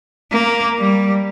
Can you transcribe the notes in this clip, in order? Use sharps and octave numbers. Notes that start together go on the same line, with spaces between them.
A#3
G3